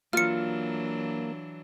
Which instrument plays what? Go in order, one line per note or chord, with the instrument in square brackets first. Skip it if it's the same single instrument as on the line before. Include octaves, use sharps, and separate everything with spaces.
[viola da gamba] E3 F#3 D4 [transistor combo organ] A#3 [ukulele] F4 [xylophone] F6 C#7